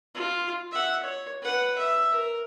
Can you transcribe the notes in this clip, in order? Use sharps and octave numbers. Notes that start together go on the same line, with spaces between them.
F4
E5 F#5
C#5
B4 F#5
E5
A#4